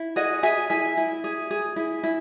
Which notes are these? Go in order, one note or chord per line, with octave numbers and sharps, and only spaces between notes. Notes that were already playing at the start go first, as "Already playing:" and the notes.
Already playing: E4
G#4 D#5 F#5
G#4 E5 G#5
E4 E5 G#5
E4
G#4
G#4
E4
E4